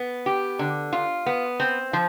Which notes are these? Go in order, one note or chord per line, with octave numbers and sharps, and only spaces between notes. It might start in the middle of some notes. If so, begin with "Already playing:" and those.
Already playing: B3
G4
D3
F4
B3
C4
F3